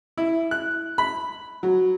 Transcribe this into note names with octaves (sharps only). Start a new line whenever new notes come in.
E4
F#6
B5
F#3